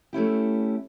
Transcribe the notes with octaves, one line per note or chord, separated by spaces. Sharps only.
A3 C#4 E4 G4